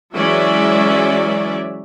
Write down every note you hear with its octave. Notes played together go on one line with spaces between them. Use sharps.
E3 F#3 G#3 C#4 D5 E5